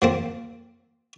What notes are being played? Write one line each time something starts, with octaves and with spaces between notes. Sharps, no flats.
F3 A#3 C4